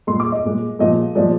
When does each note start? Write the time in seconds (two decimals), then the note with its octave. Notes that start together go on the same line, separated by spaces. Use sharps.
0.07 A#2 G#3 C6
0.20 D6
0.32 D#5
0.44 A#2 G#3
0.79 A#2 F3 G#3 D#5
1.15 A#2 F3 G#3 D5